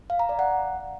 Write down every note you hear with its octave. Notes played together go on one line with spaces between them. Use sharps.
F5
A#5
D5
F#5